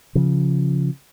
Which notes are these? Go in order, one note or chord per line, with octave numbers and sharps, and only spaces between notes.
C#3 F3